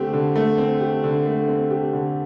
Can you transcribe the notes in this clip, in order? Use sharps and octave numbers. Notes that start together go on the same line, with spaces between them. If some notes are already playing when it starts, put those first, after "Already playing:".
Already playing: D3 A3 C4 G4
D3
A3
C4
G4
D3
A3
C4
G4
D3